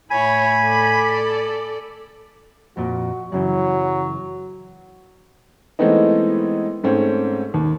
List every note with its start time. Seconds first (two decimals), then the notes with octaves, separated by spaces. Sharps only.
0.11 A2 E4 C#5 G#5 B5
0.64 A4 D5
2.77 F2 A#2 F#4
3.32 F#2 C#3 E3 F#3
5.79 E3 G#3 A3 B3 C4 D#4
6.84 G#2 A3 C4 C#4
7.54 D#2